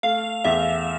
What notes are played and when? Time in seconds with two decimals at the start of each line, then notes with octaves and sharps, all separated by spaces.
0.03 A3 F5
0.44 E2 E5